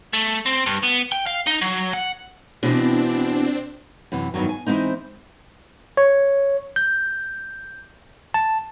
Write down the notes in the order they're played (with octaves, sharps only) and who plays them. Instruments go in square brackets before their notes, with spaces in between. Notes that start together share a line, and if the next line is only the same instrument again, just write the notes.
[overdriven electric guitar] A3
C4
G2
B3
G5
F5
D#4
F#3
F#5
[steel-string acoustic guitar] B2 E3 [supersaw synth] C4 D4
[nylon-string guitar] F#2 C3 E3
E2 G2 B2 D#3 F#3
G#5
E3 F3 G#3 C4 D#4
[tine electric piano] C#5
G6
A5